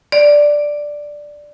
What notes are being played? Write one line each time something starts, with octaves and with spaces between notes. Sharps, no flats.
D5